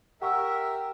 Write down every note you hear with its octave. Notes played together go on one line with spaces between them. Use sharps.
G4 A#4 E5 F#5 C#6 E6